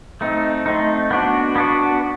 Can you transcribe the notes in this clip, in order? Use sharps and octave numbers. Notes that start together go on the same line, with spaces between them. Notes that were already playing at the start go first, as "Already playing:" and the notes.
A3 C4 D#4
A3 C4 D#4
B3 D4 F#4
B3 D4 F#4